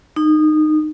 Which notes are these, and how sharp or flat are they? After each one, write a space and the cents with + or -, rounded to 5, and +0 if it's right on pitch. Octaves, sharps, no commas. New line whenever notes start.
D#4 -20